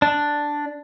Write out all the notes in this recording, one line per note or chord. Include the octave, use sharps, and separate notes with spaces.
D4